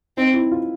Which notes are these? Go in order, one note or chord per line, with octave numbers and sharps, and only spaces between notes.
C4 D#4
E4
F4